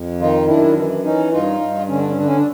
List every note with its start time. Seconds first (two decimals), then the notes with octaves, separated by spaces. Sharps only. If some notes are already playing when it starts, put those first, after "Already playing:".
Already playing: F2
0.20 D#3 D#4 F4
0.48 F#2 D4 E4
0.76 E3
1.04 E3 C#4 D#4
1.32 G2 D#4 F4
1.60 G2
1.88 D3 C#4
1.98 D4
2.08 C#4
2.17 D3 D4
2.27 C#4
2.37 D4